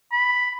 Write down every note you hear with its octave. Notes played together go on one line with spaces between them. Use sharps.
B5